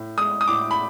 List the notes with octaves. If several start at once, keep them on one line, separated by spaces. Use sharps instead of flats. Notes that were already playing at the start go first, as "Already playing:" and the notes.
Already playing: A2
G#3 D#6
D#6
A2 D6
B5